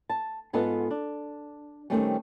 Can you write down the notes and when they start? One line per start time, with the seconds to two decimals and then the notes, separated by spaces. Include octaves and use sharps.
0.10 A5
0.53 G#2 B3 F4 A4 D#5 F#5
0.91 D4
1.90 D#3 G3 A3 C4 C#4